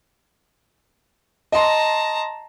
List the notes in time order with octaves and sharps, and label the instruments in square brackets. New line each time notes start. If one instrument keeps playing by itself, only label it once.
[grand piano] D#5 C6 [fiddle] A5 A#5